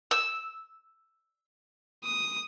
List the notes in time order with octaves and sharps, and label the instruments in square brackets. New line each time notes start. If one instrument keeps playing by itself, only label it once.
[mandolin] E6
[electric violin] D#6